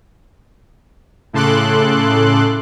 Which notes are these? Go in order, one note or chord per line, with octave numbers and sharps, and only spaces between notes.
A2 C#3 A4 C6 D6 F#6